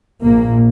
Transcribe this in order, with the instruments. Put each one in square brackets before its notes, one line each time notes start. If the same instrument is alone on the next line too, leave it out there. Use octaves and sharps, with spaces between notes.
[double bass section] A#1 A#2 A#3